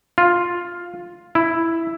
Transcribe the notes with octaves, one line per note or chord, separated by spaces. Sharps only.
F4
E4